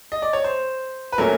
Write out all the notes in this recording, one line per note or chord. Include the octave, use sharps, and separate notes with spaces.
D#5
D5
C#5
C5
B4
A#2 F#3 A3 C#4 A#4